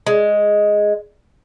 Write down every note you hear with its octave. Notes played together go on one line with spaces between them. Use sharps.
G#3